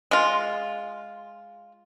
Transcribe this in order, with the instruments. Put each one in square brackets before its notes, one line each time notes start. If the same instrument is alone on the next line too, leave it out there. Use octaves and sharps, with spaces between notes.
[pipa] G#3 F4